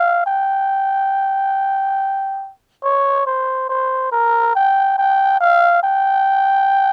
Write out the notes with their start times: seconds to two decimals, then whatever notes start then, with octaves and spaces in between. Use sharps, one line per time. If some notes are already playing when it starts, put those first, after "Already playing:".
Already playing: F5
0.26 G5
2.84 C#5
3.26 C5
3.69 C5
4.12 A#4
4.55 G5
4.98 G5
5.40 F5
5.83 G5